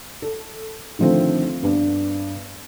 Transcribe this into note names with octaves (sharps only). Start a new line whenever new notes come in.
A4
D3 D#3 F3 A3 C4
G2 B3 D4